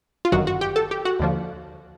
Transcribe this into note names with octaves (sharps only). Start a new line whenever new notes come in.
F4
G1 F#2 D#3 F#3 F#4
F#4
G4
A4
G4
F#4
D#2 D3 F3